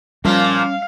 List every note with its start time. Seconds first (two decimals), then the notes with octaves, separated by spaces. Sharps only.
0.25 A#2 F3 G3 A#3 C#4 F5